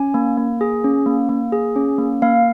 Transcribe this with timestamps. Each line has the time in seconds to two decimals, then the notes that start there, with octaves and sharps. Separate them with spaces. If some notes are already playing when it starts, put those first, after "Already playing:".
Already playing: C#4 G#5
0.14 A#3
0.38 A#3
0.61 G#4
0.84 C#4
1.06 A#3
1.29 A#3
1.52 G#4
1.76 C#4
1.98 A#3
2.22 A#3 F5